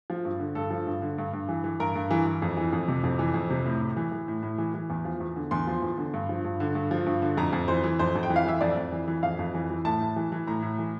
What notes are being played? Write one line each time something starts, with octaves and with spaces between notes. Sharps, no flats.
F3
G2
D3
G2 A4
F3
G2
D3
G2
G2
E3
E3
G2 A#4
G2
E3
E3
F2
E3
F2
C3
F2
E3
F2
C3
A2
A2
E3
E3
A2
A2
E3
E3
E2
F3
E2
D3
E2 C6
F3
E2
D3
G2
F3
G2
D3
G2
F3
G2
D3
F2 A#5
F2
E3 C5
E3
F2 C5
F2
G5
E3
F5
E3 E5
F2 D5
F2
E3
E3
F2 F5
F2
E3
E3
A2 A5
A2
E3
E3
A2 A#5
A2
E3